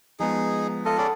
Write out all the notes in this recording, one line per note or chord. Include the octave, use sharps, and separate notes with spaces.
F3 G#3 B3 D#4 G#4
F4 A4 D#5
C#4 G#4 D5 F#5 B5